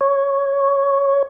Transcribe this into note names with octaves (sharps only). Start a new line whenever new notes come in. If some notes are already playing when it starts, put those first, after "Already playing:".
C#5